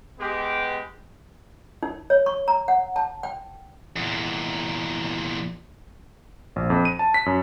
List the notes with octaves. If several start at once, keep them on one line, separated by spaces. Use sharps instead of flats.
G#3 B3 G4
D#4
C#5
C#6
A#5
F#5
A5
G5
E2 A#2
A#1
F2
D#7
A5
B6
F#2